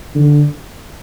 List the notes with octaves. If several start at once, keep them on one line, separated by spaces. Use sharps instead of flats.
D3